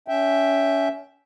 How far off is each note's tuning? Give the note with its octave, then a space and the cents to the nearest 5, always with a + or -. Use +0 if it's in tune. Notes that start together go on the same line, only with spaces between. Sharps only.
C#4 +25 E5 +0 G5 +0